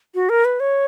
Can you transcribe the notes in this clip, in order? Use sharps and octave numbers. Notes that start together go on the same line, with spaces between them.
F#4
A#4
B4
C#5